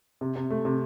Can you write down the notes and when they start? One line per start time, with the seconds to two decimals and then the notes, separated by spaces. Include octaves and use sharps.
0.21 C3
0.36 C3
0.51 A3
0.65 C3